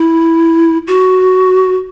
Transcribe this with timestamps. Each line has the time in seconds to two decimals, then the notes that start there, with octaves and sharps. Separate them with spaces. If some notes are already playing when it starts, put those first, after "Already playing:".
Already playing: E4
0.87 F#4